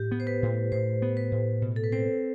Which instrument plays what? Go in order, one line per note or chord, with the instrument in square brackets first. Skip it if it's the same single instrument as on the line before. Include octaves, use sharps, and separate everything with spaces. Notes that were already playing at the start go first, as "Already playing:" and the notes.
Already playing: [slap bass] A2 [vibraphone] G4
[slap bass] B3
[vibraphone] C5
B4
[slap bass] A2
[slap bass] A2 [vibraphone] C5
[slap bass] B3
[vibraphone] B4
[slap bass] A2
B2
[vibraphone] A4
B4
[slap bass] C4 [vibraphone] C5